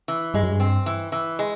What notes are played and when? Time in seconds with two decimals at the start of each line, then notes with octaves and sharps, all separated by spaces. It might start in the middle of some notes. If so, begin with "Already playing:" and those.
0.08 E3
0.34 G2 G#3
0.43 F#2
0.52 G2
0.60 C4
0.86 E3
1.12 E3
1.39 G#3